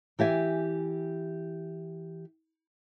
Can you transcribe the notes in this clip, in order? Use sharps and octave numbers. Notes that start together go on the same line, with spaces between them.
E3 G4 E5 G#5